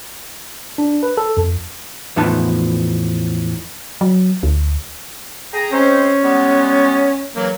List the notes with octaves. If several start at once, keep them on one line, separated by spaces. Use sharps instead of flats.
D4
B4
A4
F2
E2 A2 F3 B3 D#4 A5
F#3
D2
G#4 G5 A#5
G#3 C4 C#4 C5
G3 G#3 B3
C#3 E3 F#3 A#3